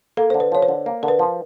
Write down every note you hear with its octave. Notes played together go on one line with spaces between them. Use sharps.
A#3 A4
D3 C5
B4
F3 C#5
C5
D3
A#3
D3 A#4
B4
F3